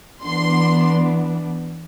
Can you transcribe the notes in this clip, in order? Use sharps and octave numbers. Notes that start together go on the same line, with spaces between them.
E3 B3 D4 C6